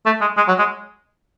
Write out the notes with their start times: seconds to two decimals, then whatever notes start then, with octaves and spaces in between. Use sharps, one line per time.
0.06 A3
0.21 G#3
0.37 G#3
0.48 F#3
0.59 G#3